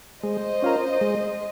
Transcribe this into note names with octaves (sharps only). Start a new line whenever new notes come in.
G#3 C5 D#5
C#4 F4 A#4
G#3